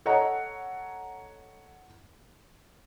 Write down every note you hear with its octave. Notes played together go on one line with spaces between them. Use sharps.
A4 C#5 D#5 F#5 A#5